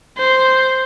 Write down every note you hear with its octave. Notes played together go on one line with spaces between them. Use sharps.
C5